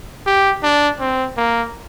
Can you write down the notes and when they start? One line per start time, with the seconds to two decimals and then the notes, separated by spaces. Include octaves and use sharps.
0.26 G4
0.63 D4
1.00 C4
1.37 A#3